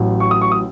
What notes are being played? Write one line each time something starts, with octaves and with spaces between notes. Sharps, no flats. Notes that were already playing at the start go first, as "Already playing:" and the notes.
Already playing: A1 A2 F#3
C#6
D#6
C#6
D#6